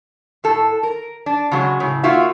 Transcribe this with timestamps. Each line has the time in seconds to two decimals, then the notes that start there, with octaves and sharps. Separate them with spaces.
0.44 A2 A4
0.83 A#4
1.26 D4
1.51 C#3 F#3 G#3
1.80 A2 C#3
2.03 A#3 D#4 F4 F#4 E5